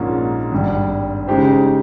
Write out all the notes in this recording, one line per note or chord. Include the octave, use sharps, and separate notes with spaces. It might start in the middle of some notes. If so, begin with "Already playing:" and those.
Already playing: A#1 G#2 F3 A#3 C#4
G#1 G2 G3
C#3 G#3 D#4 G4 C5